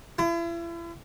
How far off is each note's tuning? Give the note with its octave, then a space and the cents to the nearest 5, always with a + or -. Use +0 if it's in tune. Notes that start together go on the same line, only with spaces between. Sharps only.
E4 +40